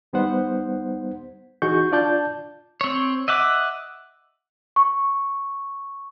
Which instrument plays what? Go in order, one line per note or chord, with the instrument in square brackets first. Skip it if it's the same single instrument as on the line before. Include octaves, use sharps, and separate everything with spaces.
[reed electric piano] D#2 G3 B3 D#4 C5 F#5
E3 D#4 F#4 G#4 C#6 G6
D4 F4 D5 A5 G6
[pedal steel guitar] C4 C#5
D#5 E5 F#5 D6
[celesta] C#6